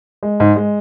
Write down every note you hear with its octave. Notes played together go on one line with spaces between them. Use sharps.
G#3
G#2
G#3